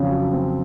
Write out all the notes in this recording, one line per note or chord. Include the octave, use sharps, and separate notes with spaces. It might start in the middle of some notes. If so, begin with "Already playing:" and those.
Already playing: F2 C#3 F#3 C4
F#3
C4